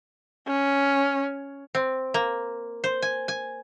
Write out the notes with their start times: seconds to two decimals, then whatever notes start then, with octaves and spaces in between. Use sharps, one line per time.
0.47 C#4
1.75 C4
2.14 A#3
2.84 C5
3.02 G#5
3.28 G#5